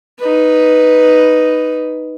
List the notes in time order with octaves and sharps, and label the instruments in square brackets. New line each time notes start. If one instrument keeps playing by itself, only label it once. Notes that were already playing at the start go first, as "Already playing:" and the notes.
[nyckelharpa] D#4 B4